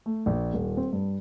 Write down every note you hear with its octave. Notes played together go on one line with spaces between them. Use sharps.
A3
A#1
D#1
C4
G2